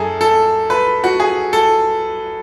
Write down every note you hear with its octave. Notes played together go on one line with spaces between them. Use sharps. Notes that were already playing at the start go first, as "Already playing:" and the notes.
Already playing: F#2 G#4 A4
A4
B4
F#4
G#4
A4